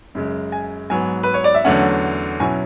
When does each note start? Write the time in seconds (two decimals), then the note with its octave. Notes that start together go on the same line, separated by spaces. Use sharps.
0.15 F#2 C#3 G#3
0.52 G#5
0.90 G#2 F#3 B3 G#5
1.23 B4
1.34 C#5
1.44 D5
1.55 E5
1.65 E2 D3 F#3 A3 C#4 F#5
2.40 B2 F#3 C#4 E4 G#5